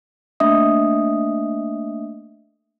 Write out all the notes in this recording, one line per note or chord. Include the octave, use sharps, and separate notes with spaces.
A3 A#3 D4 D#5 E5 D#6